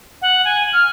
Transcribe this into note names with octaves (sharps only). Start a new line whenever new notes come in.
F#5
G#5
F6